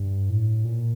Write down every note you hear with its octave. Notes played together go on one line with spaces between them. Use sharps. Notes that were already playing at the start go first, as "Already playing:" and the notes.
Already playing: G2
A2
A#2